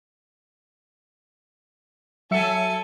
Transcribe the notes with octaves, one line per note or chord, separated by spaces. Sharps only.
F#3 A4 E5 G#5 C#7